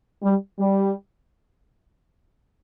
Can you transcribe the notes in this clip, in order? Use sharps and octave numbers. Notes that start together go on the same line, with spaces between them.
G3
G3